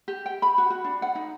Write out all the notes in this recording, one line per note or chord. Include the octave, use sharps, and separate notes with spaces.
G4
G5
B5
F#4
F#4
D4
F#5
D#4